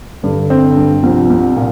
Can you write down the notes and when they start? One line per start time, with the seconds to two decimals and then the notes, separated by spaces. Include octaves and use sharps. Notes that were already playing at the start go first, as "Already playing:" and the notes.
0.24 G2 D3
0.50 C4
0.77 G2
1.03 C2 F3
1.30 C2
1.57 A#2